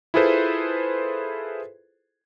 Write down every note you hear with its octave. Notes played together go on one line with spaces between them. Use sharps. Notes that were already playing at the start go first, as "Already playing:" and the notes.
E4 F4 G#4 A4 B4 C5